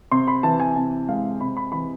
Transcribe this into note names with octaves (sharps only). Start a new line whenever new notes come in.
C3 C6
B5
E3 A5
G#5
C3 A5
G#3 F5
C3 B5
B5
E3 B5